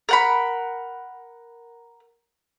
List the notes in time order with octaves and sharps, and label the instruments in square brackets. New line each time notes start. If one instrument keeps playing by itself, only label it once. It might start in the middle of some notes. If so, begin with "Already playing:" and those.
[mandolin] A#4 F#5 B5